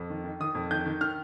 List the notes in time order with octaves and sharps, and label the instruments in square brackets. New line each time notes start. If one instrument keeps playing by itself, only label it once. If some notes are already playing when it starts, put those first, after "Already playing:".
Already playing: [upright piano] F2
D#3
D#3
D#3 D#6
F2
D#3 G6
D#3
D#3 F6